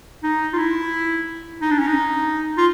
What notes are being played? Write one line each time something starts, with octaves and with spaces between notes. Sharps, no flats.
D#4
F4
E4
D#4
D4
C#4
D#4
F4